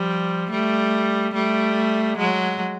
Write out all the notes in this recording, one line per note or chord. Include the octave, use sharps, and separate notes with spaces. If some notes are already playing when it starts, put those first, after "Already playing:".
Already playing: F3 G3
G3 A3
G3 A3
F#3 G#3